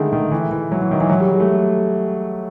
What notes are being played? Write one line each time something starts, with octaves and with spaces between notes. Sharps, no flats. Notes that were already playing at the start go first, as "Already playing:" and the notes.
Already playing: D3 D#3 G#3 A3
D#3
E3
E3
F#3
E3
D#3
E3
F#3
G3
G#3
A3